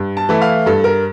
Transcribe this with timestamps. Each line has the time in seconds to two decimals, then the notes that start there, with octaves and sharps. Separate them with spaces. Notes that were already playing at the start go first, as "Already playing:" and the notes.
Already playing: G2
0.17 A5
0.29 E3 A3 E4
0.42 F5
0.66 G2 A4
0.84 A#4